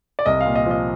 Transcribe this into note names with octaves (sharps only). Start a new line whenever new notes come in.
D5
C2 D#5
F5
A#2
D#5
F3 D#5